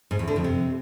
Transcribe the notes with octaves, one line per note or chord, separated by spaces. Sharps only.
G#2
E2
D3
F2
C3